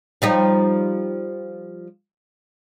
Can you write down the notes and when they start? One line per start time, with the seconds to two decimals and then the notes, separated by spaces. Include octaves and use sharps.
0.22 F3 G3 D#4